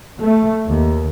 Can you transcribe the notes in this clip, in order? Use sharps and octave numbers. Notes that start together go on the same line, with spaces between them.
A3
D#2